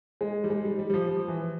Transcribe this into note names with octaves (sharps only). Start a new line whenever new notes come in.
G#3
G3
G#3
G3
G3
G3
F3
F3
E3